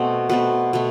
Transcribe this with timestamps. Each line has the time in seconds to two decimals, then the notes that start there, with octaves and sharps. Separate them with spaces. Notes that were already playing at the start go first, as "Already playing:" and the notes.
Already playing: B2 A3 C4
0.29 B2 A3 C4 B4
0.73 B2 A3